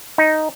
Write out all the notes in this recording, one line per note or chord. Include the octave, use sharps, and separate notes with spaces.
D#4